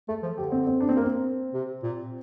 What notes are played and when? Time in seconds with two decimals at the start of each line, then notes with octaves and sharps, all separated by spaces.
0.09 A3 A4
0.23 F3
0.38 D3 G4
0.52 C4
0.67 C4
0.81 D4
0.89 C4
0.97 A#3
1.04 C4
1.54 C3
1.83 A#2